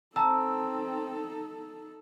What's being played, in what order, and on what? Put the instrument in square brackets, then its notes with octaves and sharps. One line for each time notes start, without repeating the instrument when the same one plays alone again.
[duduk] C4 [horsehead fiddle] D#4 A4 [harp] A5 [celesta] A#5 E6